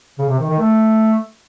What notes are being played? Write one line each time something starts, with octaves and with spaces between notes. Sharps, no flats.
C#3
C3
D#3
D#3
A3